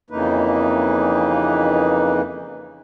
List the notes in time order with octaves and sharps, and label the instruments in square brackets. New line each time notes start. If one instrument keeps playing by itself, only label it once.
[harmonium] F2 C#3 E3 A#3 D#4 B4